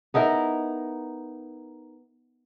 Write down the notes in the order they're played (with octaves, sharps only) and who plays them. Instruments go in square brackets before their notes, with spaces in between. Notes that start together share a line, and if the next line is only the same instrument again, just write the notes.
[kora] B3 D#4 E4 A#4